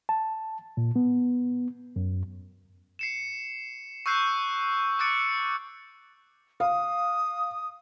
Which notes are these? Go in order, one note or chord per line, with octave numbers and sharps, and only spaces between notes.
A5
A#2
B3
F#2
C7 C#7 E7
C#6 E6 F#6 G6 C7 D#7
D6 E6 F#6 A6 C#7 D7
F5 D#6